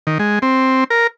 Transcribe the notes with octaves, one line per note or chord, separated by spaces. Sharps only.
D#3
G#3
C4
A#4